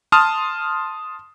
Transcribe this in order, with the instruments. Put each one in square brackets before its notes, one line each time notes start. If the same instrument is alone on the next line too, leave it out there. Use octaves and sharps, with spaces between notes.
[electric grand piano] A5 C6 D#6 F6